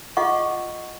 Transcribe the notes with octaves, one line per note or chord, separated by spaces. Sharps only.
F4 G#4 D#5 F#5 C#6